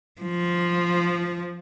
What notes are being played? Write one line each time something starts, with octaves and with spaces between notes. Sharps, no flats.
F3